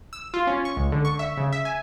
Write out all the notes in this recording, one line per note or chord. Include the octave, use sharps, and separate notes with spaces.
E6
F4
C#4
C#6
C#2
D3
C#6
E5
C#3
E5
G#5